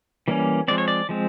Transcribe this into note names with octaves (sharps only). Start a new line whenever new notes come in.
E3 G3 A#3 C#4
F3 G#3 C4 D5
C#5
D5
F3 G#3 C4